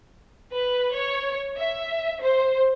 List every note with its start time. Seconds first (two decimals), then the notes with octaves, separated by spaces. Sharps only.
0.53 B4
0.95 C#5
1.59 E5
2.22 C5